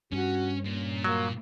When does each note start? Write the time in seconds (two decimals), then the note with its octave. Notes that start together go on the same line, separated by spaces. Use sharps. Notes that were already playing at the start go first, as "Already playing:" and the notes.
0.12 G2 C#4 F#4
0.65 A#2 C#4
1.04 F#3 A#3